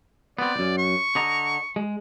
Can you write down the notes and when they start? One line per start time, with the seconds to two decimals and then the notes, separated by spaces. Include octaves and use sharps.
0.39 B3 C4 D5
0.56 C#2 F#2
0.77 C#6
1.15 D3 D#5 A#5
1.76 G#3